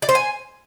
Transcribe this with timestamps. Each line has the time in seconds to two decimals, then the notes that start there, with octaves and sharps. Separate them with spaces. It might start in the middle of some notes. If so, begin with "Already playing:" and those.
0.02 D5
0.09 C5
0.15 G#5